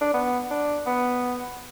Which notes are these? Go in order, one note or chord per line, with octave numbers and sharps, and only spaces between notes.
D4
B3
D4
B3